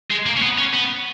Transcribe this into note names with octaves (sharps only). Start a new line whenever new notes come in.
G#3
A#3
C#4
B3
C#4
B3